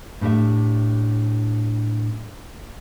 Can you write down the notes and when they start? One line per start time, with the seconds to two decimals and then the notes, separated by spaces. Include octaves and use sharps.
0.21 A2 D4 G4 E5